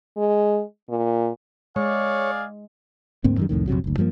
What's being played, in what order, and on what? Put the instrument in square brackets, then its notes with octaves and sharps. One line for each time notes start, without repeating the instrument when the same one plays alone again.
[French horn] G#3
A#2
[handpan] G#3 [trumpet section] G#4 D5 F5 [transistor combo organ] C#5
[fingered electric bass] D2 G#2 A#3 C4
F#2 D#3 G3
C2 F2 A2 D#3
A#1 F2 C3 F#3
F#1 D2
G2 F3 F#3 A#3